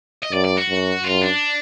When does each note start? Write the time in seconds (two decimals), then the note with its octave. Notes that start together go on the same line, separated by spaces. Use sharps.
0.23 D#5
0.32 F#2 D5
0.44 D5
0.57 F#4
0.69 F#2
1.04 F#2 F4
1.22 D4